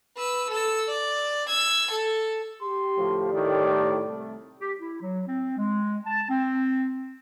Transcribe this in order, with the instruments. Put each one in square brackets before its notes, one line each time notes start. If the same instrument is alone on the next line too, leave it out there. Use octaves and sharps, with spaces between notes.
[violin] B4 E6
A4 E6
D5
E6 G#6
A4
[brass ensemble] G4 [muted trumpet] C6
[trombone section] D2 A2 F3
[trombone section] A2 D#3 [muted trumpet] D5
[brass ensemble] C2 A3
[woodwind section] G4
E4
F#3
C4
G#3
A5
C4